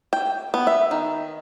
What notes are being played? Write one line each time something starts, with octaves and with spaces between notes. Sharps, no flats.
G5
B3
E5
D#3